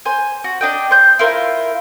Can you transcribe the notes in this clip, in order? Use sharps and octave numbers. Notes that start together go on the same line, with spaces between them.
C5 G#5
F#4
D4 D#5 G5
C5 G6
E4 F4 A#4 C5